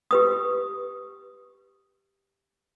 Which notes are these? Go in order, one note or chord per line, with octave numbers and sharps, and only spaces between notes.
G4 B4 D#6